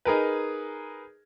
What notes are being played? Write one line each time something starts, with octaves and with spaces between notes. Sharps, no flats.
D#4 G#4 A#4 B4